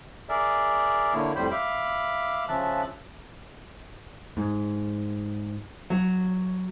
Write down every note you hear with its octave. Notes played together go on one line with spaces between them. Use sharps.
G#4 A#4 D5 E5
A#2 D3 A#3 E4 C#5
F2 A2 G3 C5 G5 B5
E5 F5 B5 D6
C#3 F3 E5 A5 F#6
G#2
F#3